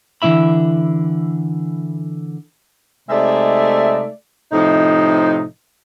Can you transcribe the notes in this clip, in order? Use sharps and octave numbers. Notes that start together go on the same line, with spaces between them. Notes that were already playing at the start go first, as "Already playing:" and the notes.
D3 E3 F#3 E4 E5 B5
C3 G#3 A3 D#4 D5 E5
A2 C3 F3 D#4